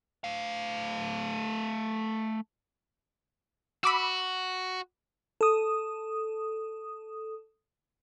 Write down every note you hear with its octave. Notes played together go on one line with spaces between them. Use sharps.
A3 F5
F#4 B5 D6 E6
A4 D#6